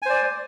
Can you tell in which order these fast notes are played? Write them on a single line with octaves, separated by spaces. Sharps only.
G#5 C5 D5